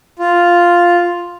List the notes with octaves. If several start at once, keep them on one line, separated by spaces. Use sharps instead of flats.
F4